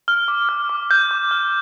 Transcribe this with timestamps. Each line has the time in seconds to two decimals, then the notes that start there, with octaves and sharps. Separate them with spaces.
0.08 F6
0.28 D6
0.49 F6
0.69 D6
0.90 F6 G6
1.11 D6
1.31 F6